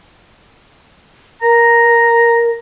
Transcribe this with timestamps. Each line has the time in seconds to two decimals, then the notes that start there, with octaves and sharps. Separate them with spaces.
1.42 A#4 A#5